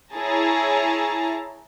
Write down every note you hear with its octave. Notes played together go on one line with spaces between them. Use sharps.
E4 G#4 C#5 A5 A#5